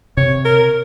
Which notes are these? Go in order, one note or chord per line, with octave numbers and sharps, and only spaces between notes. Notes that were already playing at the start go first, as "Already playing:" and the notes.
C3 C#5
A#4